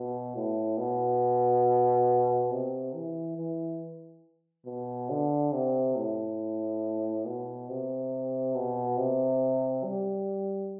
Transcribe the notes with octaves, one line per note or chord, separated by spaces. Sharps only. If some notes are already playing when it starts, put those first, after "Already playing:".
Already playing: B2
A2
B2
C3
E3
E3
B2
D3
C3
A2
B2
C3
B2
C3
G3